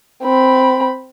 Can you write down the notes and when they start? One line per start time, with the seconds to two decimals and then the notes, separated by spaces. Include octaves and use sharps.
0.23 C4 B5